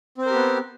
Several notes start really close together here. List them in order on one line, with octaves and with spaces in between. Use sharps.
C4 C5 A#4 G4 B3